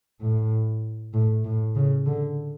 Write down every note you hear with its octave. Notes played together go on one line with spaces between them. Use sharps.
A2
A2
A2
C#3
D3